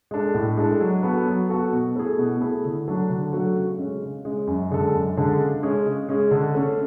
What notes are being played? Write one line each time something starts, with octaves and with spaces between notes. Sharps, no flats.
G#3 D4 A4
A2
G#3 D4 A4
F#3
B3 F#4 A4
F#3
B3 F#4 A4
B2
A3 E4 G#4
B2
A3 E4 G#4
D3
F#3 A3 D4 F#4
D3
F#3 A3 D4 F#4
C#3
G#3 C#4
C#3
G#3 C#4
F#2
D3 G#3 D4 A4
F#2
D3 G#3 D4 A4
C#3
G#3 C#4 G#4
C#3
G#3 C#4 G#4
D3
A3 C#4